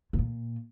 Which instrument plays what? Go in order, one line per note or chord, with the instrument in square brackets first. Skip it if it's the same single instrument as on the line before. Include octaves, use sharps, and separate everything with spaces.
[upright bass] C3
A#2